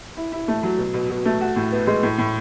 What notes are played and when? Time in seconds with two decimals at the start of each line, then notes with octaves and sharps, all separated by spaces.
0.17 E4
0.32 E4
0.48 A3
0.63 F#3
0.78 B2
0.94 B2
1.10 B2
1.25 A3
1.41 F#4
1.56 A2
1.72 B3
1.87 G#3
2.03 A2
2.18 A2